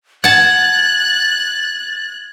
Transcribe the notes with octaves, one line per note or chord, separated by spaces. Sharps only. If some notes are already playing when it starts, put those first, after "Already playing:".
F#5 A5 F#6 G#6 A6